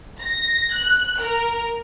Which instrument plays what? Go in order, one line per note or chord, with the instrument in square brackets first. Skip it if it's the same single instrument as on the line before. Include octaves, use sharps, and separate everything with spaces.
[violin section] A#6
F#6
A#4